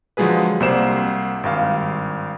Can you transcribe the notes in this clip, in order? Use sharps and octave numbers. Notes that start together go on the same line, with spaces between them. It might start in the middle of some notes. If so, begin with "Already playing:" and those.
D3 F3 F#3 G#3 G#4 B4
C2 C3 A#3 C5 D5 E7
G#1 G2 F5